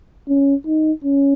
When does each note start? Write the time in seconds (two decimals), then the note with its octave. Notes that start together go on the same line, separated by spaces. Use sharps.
0.28 C#4
0.66 D#4
1.04 C#4